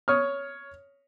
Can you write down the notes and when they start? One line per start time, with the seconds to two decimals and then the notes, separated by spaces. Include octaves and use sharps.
0.08 C#5 C#6 D#6 F6